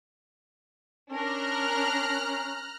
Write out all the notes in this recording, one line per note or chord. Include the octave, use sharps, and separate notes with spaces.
C#4 D4 A#4 A#5 F6 F#6